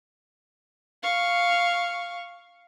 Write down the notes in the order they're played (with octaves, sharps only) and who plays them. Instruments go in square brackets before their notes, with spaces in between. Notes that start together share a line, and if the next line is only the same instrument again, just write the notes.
[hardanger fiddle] F5 C#6